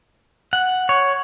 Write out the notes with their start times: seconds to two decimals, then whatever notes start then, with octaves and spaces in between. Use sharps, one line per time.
0.53 F#5
0.89 C#5